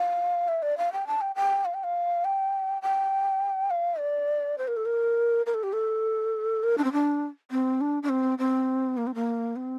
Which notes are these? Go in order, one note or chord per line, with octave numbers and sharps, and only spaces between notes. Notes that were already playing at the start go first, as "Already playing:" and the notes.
Already playing: F5
E5
D5
F5
G5
A5
G5
G5
F5
G5
F5
G5
G5
F5
D5
C5
A#4
A4
A#4
A#4
A4
G4
A4
A#4
D4
C4
D4
C4
D4
D4
C4
C4
A#3
C4
A#3
C4